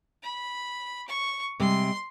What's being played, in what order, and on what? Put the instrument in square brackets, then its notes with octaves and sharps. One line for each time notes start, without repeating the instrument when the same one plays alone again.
[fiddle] B5
C#6
[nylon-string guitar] C3 G3 G#3 [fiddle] C6